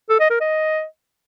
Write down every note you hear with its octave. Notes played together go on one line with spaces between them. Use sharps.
A4
D#5
A#4
D#5